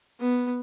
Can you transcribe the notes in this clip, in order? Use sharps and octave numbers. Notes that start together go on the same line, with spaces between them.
B3